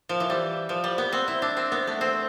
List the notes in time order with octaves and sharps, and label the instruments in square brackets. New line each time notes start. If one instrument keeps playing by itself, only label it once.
[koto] F3
E3
G3
F3
G3
B3
C4
E4
D4
C4
B3
A3
C4